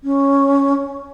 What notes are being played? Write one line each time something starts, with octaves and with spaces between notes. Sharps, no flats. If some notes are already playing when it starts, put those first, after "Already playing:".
C#4